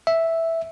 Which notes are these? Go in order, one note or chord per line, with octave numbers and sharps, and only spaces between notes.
E5